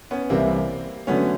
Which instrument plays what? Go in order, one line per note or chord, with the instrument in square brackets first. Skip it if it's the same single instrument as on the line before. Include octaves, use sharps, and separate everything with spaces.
[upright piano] B3 C#4
[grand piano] C2 C3 E3 G3 [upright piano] A#3 C4
[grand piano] D3 F#3 A3 [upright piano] B3 C#4